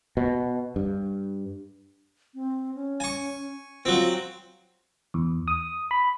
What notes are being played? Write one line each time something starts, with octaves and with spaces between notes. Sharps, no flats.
B2
G2
C4
C#4
G#5 C#6
F#3 C4 F4
E2
D#6
B5